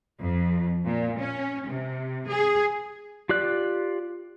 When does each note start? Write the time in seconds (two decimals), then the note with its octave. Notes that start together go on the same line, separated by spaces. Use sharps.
0.20 F2
0.86 A#2
1.21 C#4
1.68 C3
2.27 G#4
3.29 F4 G4 D5 F#6